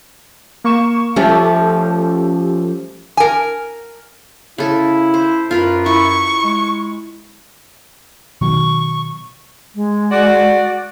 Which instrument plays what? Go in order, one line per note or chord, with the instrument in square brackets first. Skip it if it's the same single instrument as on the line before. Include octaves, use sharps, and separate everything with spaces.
[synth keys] A#3 C#6 E7
[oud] F3 A3 [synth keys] C#4 G4 A4
[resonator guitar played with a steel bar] A#4 G#5
[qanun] C#3 A4 [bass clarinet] E4
[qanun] C5
[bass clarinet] F#2 [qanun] F4 A#4 B4
[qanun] E4 [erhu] C#6
[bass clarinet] G#3
[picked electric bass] B2 D#3 F#3 [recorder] C#6
[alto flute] G#3
[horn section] F#4 D5